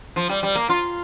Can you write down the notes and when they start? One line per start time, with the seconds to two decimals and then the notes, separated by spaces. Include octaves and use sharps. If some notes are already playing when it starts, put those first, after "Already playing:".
0.16 F3
0.29 G3
0.43 G3
0.55 A#3
0.69 F4